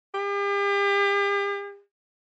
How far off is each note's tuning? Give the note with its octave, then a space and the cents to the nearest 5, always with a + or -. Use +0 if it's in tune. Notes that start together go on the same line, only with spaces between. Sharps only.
G4 +40